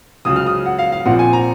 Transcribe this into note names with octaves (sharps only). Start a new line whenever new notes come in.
C#2 C#3 F#3 D#6
F6
D#6
F#5
F5
F5
A#1 A#2 F3 C4 F#5
G#5
A#5